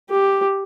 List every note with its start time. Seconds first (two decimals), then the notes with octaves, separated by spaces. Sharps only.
0.10 G4